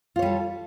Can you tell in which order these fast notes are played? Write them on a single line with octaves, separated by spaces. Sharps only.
F4 C#5 G3 A4